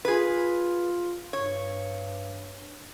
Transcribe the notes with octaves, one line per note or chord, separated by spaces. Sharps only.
F4 G#4 B4
G2 C#5